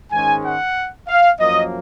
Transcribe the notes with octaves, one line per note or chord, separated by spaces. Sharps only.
G#2 D#3 G#3 C#4 G#5
F#5
F5
F#2 F3 A#3 D#5